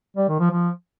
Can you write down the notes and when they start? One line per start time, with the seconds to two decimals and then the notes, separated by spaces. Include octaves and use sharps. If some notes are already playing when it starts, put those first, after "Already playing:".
0.17 G3
0.28 D#3
0.40 F3
0.51 F3